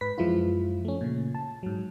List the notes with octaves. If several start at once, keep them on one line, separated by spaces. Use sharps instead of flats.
G#2 B4 B6
F#2 F3 G#3 E4 F4
A3 C#4
A#2 C#3
A5
G#2 F#3